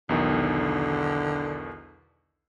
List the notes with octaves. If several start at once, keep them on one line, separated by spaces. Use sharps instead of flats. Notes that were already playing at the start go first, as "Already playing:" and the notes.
B1 E2 D3 D#3